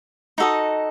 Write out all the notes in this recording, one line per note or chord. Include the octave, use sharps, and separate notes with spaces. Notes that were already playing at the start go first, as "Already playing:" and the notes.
D#4 F#4 A4 D#5